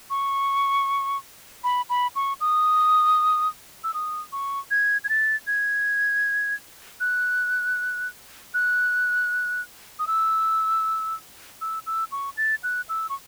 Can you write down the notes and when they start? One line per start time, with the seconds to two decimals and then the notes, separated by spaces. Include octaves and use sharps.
0.10 C#6
1.64 B5
1.90 B5
2.16 C#6
2.41 D#6
3.84 E6
3.94 D#6
4.32 C#6
4.71 G#6
5.04 G#6
5.09 A6
5.47 G#6
7.00 F#6
8.54 F#6
9.99 D#6
10.07 E6
11.61 E6
11.86 E6
12.12 C#6
12.37 A6
12.63 F#6
12.89 E6
13.10 C#6